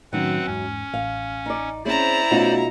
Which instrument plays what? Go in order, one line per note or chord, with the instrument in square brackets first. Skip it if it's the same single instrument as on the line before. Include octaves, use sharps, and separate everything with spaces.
[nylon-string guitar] F#2 [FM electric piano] A2 D#3 F#3 [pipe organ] C4 B4 F#5
[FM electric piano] E2 G#2 [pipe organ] C#4
[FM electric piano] A1 [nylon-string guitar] F5
[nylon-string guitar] D#4 D5
[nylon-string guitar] C4 C#4 G#4 [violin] E4 A#5 [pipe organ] C5 D5
[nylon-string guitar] B2 D#4 F4 [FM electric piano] A3 C#4 F#4